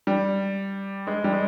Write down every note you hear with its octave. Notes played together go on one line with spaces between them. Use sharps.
G3
G#3
G3
G#3